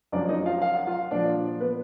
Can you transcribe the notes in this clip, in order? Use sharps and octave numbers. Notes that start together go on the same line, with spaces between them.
F#2 F3 D4 D5
D#4 D#5
F4 F5
F5
F#5
F4 F5
A#2 F3 D4 D5
B3 B4